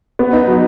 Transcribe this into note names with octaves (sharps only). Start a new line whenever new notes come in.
B3
D#4
F#3